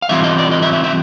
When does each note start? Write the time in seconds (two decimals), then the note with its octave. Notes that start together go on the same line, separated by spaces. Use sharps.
0.02 F5
0.09 E3 G3 C4 F4 E5
0.24 D#5
0.38 D5
0.51 D#5
0.62 E5
0.73 E5
0.84 E5